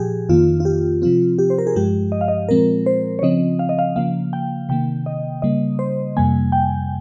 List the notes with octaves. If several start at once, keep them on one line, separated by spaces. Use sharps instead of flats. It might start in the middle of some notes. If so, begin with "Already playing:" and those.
Already playing: A#2 F3 G4 G#4
F2 D#3 A#3 F4
F4
G4
C3 F3 C4 F4
G4
C5
A#4
G#4
G2 F3 G#3 G4
D#5
F5
D#5
A#2 F3 G#3 C4 A#4
C5
C#5
C#3 F3 C4 D#5
F5
D#5
F5
C#3 F3 A#3 F5
G5
C3 D#3 A#3 G5
D#5
C#3 G3 A#3 D#5
C5
F2 C3 G3 A#3 G#5
G5